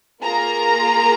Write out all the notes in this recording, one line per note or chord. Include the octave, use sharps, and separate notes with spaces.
A#3 F4 G#4 A#5